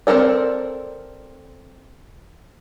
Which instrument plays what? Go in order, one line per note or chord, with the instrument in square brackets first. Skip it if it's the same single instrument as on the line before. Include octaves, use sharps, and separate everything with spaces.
[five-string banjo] C4 D#4 A4 A#4 D5